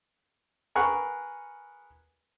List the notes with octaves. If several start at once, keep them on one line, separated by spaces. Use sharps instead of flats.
G#4 A#4 B4 F#5 C#6